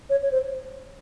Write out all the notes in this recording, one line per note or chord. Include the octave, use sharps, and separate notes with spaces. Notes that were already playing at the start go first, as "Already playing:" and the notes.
C#5
C#5
C5